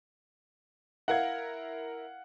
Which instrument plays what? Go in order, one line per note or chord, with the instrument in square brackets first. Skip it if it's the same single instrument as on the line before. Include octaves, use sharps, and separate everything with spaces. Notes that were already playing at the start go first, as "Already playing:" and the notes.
[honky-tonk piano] E4 A#4 G#6 [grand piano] F5 F#5